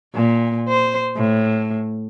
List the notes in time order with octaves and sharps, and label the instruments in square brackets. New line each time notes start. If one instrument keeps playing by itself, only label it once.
[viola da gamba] A#2
C5
A2